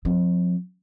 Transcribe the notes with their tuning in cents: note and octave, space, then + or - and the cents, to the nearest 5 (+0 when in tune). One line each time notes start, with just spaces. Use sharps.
F3 +35 C4 +0